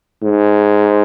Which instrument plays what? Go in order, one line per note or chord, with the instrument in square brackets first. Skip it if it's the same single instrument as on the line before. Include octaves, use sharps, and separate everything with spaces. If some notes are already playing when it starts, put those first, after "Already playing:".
[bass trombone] G#2